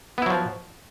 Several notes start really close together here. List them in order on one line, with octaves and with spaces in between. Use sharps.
B3 E4 F#3 F3